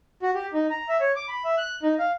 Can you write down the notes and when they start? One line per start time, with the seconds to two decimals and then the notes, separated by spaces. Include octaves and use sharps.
0.23 F#4
0.34 G4
0.53 D#4
0.70 A#5
0.89 E5
1.00 C#5
1.16 D6
1.28 B5
1.45 E5
1.58 F#6
1.83 D#4
1.99 F5